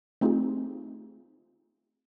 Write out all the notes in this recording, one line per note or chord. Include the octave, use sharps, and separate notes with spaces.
A3 C4 D#4 F4 G4 G#4